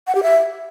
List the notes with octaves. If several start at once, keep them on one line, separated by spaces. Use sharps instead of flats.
F#5
G4
E5